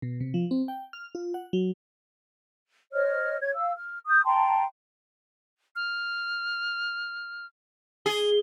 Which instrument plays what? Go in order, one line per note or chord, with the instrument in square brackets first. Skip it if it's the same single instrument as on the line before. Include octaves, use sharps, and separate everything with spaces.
[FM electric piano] B2
C3
F3
C4
G5
F6
F4
F#5
F#3
[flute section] C5 C#5 D#5 F6
C#5 G#6
F5 E6
F6
D#6 G6
G5 A5 A#5 C6
[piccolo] F6
[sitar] G#4 [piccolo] G7